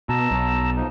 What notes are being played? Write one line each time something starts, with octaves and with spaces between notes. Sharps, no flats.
B2 A5 A#5 E6
B1
F3 D#4